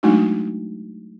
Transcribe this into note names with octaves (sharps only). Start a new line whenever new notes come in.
F#3 G#3 A3 D4 D#4 F#4